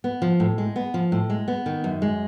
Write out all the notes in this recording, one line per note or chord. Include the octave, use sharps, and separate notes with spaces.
B3
F3
A2
G#3
B3
F3
A2
G#3
B3
D#3
F#2
G#3